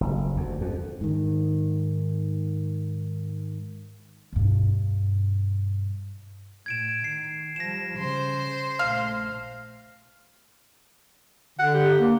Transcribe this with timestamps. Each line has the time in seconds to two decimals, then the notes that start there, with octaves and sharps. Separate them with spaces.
0.01 F#1
0.36 D2
0.61 F2
1.01 G#2 D#3
4.33 G2 B2
6.66 A2 G#6 D7 E7
7.04 D#3 C7
7.56 F3 G3 A#6 E7
7.98 C#3 C5 C6
8.79 A#1 A3 F5
11.59 D3 F#5
11.74 G4
11.98 A#3